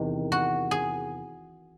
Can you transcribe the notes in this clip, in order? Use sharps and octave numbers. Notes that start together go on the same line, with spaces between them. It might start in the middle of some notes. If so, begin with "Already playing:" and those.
Already playing: E2 C3 D#3
F#4
G#4